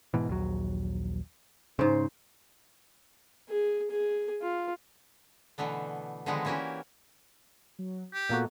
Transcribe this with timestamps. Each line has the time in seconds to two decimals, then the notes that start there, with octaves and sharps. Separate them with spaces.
0.14 G#2 B2 E3
0.29 A#1 D#2 F#3
1.79 G#2 C#3 C5
3.49 G#4
3.91 G#4
4.42 F4
5.58 B2 D3 E3 A3 B3
6.26 D3 D#3 F3 G#3 B3 D#4
6.45 E3 A#3 C#4 E4 F#4 G4
7.79 F#3
8.14 G4 G5
8.29 A#2 A#3 B3 F#4 A4